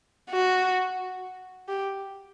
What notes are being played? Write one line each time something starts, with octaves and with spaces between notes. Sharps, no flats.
F#4
G4